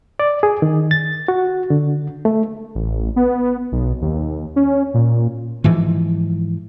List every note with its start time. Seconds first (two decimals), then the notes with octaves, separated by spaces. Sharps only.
0.19 D5
0.43 G#4
0.62 D#3
0.91 A6
1.28 F#4
1.70 D3
2.25 A3
2.75 A1
3.16 B3
3.72 B1
4.02 D#2
4.56 C#4
4.94 A#2
5.64 G#2 E3 F3